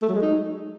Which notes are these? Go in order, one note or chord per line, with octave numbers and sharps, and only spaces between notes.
A3
F#3
G#3
D#4